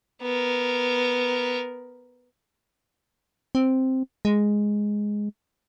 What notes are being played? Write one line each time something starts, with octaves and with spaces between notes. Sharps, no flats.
B3 A#4
C4
G#3